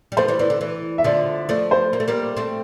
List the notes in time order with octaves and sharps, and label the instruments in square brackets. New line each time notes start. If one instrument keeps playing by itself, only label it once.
[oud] G3
[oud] F3 A3 [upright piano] C5
[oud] E3 G3
[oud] E3 [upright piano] D5
[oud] D3
E3
[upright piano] E5
[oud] D3 F3 [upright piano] D5
[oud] F3 A3 [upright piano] D5
[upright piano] C5
[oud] A#3
A3
G3 A#3
A3 C4